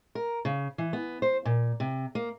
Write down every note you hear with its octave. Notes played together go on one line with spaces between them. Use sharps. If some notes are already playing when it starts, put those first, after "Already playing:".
A#4
C#3
E3
B3
C5
A#2
C3
A#3